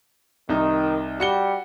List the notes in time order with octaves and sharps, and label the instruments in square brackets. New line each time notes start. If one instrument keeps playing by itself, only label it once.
[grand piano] C2 D#4 [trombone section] D#3
[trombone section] G3 [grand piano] F#4 C#7 G7